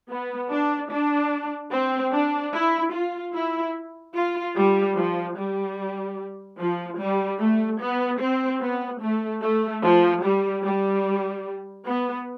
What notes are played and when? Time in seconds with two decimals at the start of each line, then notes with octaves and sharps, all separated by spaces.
0.09 B3
0.51 D4
0.91 D4
1.72 C4
2.13 D4
2.54 E4
2.94 F4
3.34 E4
4.15 F4
4.56 G3
4.97 F3
5.37 G3
6.59 F3
6.99 G3
7.40 A3
7.81 B3
8.20 C4
8.61 B3
9.01 A3
9.42 A3
9.84 F3
10.23 G3
10.64 G3
11.86 B3